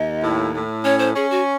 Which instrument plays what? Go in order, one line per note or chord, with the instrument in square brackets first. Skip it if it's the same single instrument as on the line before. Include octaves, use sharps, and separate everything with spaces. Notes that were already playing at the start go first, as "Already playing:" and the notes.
Already playing: [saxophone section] D#2 [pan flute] D#5
[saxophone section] A2
A2
[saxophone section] C#4 [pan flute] C#5
[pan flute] C5
[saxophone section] C#4 [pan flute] G#4
[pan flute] F#4